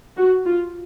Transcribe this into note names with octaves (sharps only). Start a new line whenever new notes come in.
F#4
F4